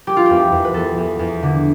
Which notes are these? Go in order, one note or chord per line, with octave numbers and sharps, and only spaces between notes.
G3 G4
F4
E2 G4
E2
B4
E2 A4
E2
E2
D3